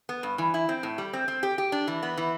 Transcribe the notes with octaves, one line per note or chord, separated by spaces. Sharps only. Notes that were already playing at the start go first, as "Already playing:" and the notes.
B3
G2
E3
E4
C4
A2
G3
C4
C4
G4
G4
D4
E3
B3
E3